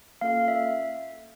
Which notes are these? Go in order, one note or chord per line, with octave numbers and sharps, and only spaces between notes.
A#3 C#4 F4 A4 F5
E5